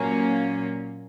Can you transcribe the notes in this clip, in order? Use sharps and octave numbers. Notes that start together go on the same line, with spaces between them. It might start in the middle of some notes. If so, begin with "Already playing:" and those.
Already playing: A#2 F#3 A#3 C#4